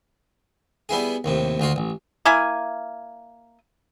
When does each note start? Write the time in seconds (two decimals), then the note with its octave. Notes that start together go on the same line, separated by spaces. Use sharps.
0.89 G3 B3 E4 G#4
1.24 D#2 A2 C3
1.60 D2 F4 F#4
1.76 A1
2.25 A#3 E4 G#5